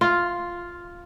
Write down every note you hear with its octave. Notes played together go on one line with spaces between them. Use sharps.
F4